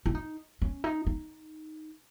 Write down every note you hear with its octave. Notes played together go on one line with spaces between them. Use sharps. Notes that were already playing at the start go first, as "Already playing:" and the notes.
E4
D#4
C#4
D#4
D#4